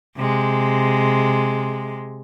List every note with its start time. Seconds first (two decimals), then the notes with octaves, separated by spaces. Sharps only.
0.16 C3 G#3